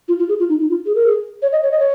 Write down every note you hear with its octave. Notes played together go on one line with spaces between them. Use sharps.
F4
F4
G#4
F4
D#4
D#4
F4
G#4
A#4
G#4
C#5
D#5
C#5
D#5
C#5